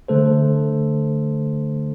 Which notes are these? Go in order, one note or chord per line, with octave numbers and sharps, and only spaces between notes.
D3 A3 A4 C5